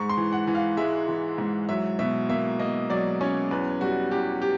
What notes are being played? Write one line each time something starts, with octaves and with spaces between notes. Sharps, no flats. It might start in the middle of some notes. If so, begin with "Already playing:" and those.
Already playing: G#2 C#6
C6
E3
F#5
E3
F5
G#3 E5
E3
G#2
F#3 E5
B2 E5
A#3 E5
A#3 D#5
F#3 D5
C#4 C#5
E2 B4
G3 F#4
E2 G4
G4